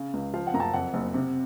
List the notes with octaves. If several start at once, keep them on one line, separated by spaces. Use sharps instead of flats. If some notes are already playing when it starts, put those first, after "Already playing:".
Already playing: C#3
C#2
F3 F5
F#5
F#2 A#5
A5
F2 F#5
F#1
C3